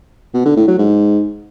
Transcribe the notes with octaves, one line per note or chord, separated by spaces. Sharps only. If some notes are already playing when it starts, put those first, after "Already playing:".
B2
D3
A2
F#3
G#2